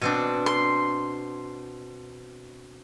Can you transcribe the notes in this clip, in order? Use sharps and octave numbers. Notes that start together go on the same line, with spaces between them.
B2 C4 D4
C6